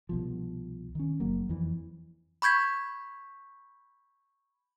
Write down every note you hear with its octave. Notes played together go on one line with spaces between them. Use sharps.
C2 B2 F3
D#3 C#4
F#1 F#3 A#3
F2 E3
B5 C#6 G6 G#6 B6